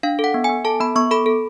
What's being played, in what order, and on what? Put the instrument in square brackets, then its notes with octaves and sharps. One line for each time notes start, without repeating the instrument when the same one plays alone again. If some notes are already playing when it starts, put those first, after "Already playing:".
[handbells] D4 F5
A4
F#5
B3
B3 G#5
A4 A5
B3 B5
B3 C#6
A4 B5
A4